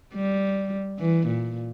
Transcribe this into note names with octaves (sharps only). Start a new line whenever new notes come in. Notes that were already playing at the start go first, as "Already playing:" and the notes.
G3
E3
A#2